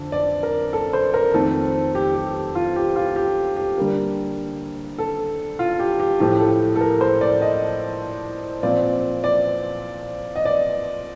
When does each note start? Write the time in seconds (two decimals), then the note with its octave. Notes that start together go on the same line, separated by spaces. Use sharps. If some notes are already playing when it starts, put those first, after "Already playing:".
Already playing: F2 D3 C4
0.12 D5
0.43 A#4
0.73 A4
0.93 C5
1.14 A#4
1.34 F2 D#3 A3 C4 A4
1.95 G4
2.15 G4
2.55 F4
2.76 G4
2.96 F4
3.16 G4
3.56 G4
3.77 D3 G3 A#3
4.98 A4
5.59 F4
5.80 G4
6.00 G4
6.20 A2 F3 A3 G4
6.40 A4
6.76 A4
6.81 A#4
7.01 C5
7.21 D5
7.41 D#5
8.63 A#2 F3 C4 D5
9.24 D5
10.36 D#5
10.45 D5